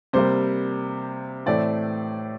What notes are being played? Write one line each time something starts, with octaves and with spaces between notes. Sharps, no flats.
C3 G3 A#3 C5
A2 E3 A3 C4 D5